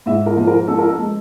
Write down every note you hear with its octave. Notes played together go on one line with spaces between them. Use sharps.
G#2 E5
A#4
F3
A#4
C#4 A4
A#4
A4
G#3